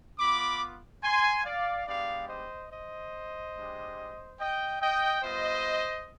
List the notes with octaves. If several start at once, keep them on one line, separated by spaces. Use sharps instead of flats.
B3 F4 B5 D6
G#5 C6
D5 F5
G#3 B3 D4 G4 D5 F5
C5 D#5
C5 D#5
G#3 D4 G4
D#5 G5
D#5 G5
G3 B3 F4 C5 D#5